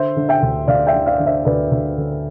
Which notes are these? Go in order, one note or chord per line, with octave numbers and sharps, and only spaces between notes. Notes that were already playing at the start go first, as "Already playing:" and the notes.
Already playing: D3 C5 E5
D3
E5 G5
D2
D2 D5 F5
E5 G5
D3
D5 F5
D3
C5 E5
D2 B4 D5
D2
D3